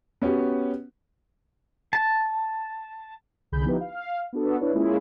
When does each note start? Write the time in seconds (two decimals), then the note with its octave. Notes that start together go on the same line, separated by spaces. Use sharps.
0.22 B3 C#4 F#4 G4
1.93 A5
3.52 C2 D3 G#4 B5 G6
3.64 F3 B3 D#4 E4 G4 B4
3.81 F5
4.33 B3 D4 F#4 A4
4.61 D4 E4 B4 C#5
4.73 G#3 A#3 C#4 E4 F4 G#4